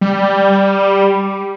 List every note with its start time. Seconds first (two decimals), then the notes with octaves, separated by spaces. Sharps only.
0.01 G3